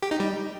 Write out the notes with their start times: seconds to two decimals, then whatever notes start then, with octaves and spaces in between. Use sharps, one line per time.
0.02 G4
0.11 D#4
0.20 G3